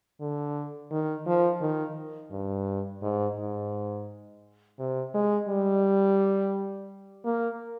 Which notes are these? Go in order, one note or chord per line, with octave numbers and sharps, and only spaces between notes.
D3
D#3
F3
D#3
G2
G#2
G#2
C3
G#3
G3
A#3